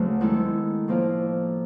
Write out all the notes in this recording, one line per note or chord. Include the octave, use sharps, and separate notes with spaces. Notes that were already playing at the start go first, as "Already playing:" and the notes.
Already playing: D2 C#3 F#3 A3
D#3 G#3 B3 E4 A4
A2 F3 A#3